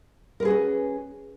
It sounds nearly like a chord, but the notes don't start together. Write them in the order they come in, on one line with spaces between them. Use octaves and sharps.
A#4 B4 G#4 F#4 C#4